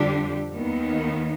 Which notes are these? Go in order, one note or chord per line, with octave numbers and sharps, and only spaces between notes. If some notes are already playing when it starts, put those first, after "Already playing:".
Already playing: F2 D3 G3 D4 G4
D#2 D#3 B3 D#4